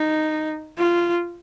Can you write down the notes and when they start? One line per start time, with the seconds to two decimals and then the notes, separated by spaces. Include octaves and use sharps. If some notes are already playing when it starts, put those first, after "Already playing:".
Already playing: D#4
0.78 F4